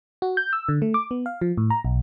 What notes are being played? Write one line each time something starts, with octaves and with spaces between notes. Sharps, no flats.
F#4
G6
E6
D3
A3
D6
B3
F5
F3
A2
A#5
B1